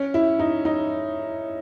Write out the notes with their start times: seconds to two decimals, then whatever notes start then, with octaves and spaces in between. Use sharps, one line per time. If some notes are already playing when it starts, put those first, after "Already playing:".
Already playing: C#4
0.14 E4
0.39 D#4
0.65 D#4